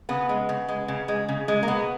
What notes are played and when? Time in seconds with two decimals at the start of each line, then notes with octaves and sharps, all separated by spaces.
0.09 C#3 B3
0.29 G#3
0.49 C#3
0.68 G#3
0.88 C#3
1.08 G#3
1.29 C#3
1.48 G#3
1.63 A#3
1.68 B2 B3